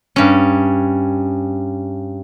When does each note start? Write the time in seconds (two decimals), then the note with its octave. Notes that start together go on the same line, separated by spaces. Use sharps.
0.16 G2 C#4